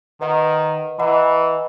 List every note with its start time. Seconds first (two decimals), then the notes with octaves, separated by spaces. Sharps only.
0.20 D#3 B4 D#5 F#5 A#5
0.99 E3 B4 D#5 F#5 A#5